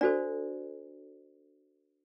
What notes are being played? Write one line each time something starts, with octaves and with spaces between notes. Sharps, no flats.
D4 F#4 A4 C5 D5